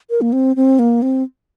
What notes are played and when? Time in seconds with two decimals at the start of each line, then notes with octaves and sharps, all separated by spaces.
0.10 A#4
0.21 A#3
0.33 C4
0.56 C4
0.79 A#3
1.02 C4